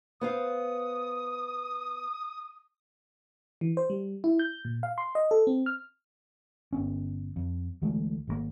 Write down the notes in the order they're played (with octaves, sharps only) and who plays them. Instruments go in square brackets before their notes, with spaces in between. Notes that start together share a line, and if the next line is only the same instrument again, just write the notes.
[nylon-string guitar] B3 C5 F5 [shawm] D#6
[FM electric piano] E3
C5
G3
E4
G6
A#2
F5
C6
D#5
A4
C4
F6
[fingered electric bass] G1 B3 C#4
F2
D2 E3 G#3 A3
G#1 C#3 A#3